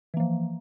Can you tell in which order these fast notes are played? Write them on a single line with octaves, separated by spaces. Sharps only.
E3 A#3 F3